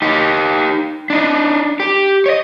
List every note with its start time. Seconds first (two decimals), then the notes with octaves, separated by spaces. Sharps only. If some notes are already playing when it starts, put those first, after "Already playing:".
0.02 D#4 G4
1.10 D4 D#4
1.80 G4
2.26 C#5 D#5